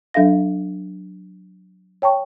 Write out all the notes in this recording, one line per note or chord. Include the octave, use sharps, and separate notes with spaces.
F#3 D4 A4 E5 F5 A#6
C#5 G5 A5 C#6